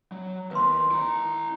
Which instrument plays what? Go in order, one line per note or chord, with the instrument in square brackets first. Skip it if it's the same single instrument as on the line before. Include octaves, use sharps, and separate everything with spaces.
[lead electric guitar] F#3
[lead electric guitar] D#2 [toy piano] B4 C6
[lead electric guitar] E4 A#5